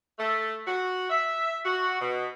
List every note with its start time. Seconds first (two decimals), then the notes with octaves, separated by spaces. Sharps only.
0.18 A3
0.66 F#4
1.09 E5
1.64 F#4
2.00 B2